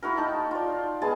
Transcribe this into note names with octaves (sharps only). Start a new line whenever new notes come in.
A#3 E4 F#4 A#4
D#4 G5 A5
F4 D5
G#3 B3 G#4 A5